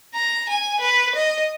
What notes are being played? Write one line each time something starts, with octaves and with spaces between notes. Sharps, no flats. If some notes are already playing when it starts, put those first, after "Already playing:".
A#5
G#5
B4
D#5